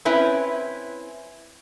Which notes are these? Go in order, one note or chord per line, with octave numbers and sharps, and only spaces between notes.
C4 C#4 E4 B4